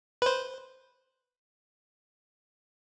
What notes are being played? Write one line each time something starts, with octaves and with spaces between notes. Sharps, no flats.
B4 C5